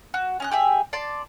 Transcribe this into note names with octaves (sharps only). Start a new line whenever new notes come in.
F#4
C#4 D#5 F#6
G4 G#4 E5
D5 A5 C6